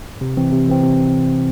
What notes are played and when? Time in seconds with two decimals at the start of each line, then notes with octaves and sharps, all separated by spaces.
0.21 C3
0.37 E3 C4
0.52 C3
0.68 E3 C4
0.83 C3